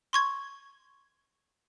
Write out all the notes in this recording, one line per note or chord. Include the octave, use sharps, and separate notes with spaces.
C6 C#6 G#6